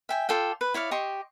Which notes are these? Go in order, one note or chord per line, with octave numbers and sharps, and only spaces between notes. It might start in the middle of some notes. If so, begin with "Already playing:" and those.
E5 G5 G#5
F4 A4 D5 G5
B4
E4 C#5 D5 F5
G4 D#5 C6 C#6